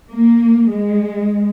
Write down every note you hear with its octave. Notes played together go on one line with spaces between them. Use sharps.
A#3
G#3